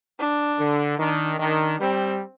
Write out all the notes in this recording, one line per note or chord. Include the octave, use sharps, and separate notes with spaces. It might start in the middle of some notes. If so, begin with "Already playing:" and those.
D4
D3
D#3 D4
D#3 D4
G3 C4